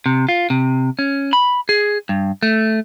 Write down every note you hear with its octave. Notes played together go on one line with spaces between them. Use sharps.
C3
F4
C3
C#4
B5
G#4
G2
A3